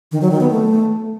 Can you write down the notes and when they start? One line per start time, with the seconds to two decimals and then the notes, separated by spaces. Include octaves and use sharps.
0.12 D#3
0.21 F#3
0.31 D#3
0.41 B3
0.50 A3